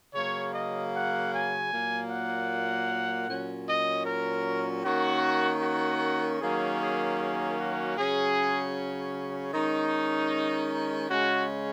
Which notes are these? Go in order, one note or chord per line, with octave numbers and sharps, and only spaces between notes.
C#3 F#3 A#3 C#5
D#5
F#5
G#5
A#2 F#3 A#3
F#5
A#2 F#3 C#4
D#5
A#4
D#3 A#3 C#4 F#4
F#4
D#3 F#3 A#3 C#4 G#4
G#4
G#4
F#4
C#3 F#3 C#4 G#4
D#3 G#3 C#4 D#4
C#3 G#3 C#4 F#4